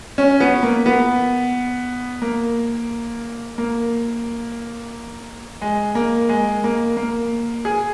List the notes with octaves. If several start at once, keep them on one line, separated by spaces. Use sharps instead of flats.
C#4
B3
A#3
B3
A#3
A#3
G#3
A#3
G#3
A#3
A#3
G#4